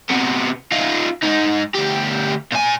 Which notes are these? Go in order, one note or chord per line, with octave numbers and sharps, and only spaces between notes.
C3 B3
D#4 F4
G#2 D#4
D2 G4
A#2 G#5